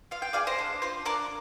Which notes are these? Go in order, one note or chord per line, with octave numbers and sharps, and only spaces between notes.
F4 F5
G5
G#4 D5 F5
C5 D#5
D4
F4 C5
D4 A#4 D5